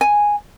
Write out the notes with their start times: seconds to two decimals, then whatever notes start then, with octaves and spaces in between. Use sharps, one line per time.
0.01 G#5